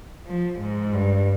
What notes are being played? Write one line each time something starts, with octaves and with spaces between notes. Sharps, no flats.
F3
G#2
G2